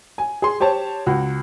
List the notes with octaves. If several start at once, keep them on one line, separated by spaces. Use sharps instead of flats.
G#5
G#4 C6
G4 C5 C#5 A5
C#2 F#4